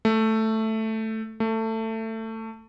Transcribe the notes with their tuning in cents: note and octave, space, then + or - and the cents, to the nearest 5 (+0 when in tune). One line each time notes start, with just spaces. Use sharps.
A3 +5
A3 +20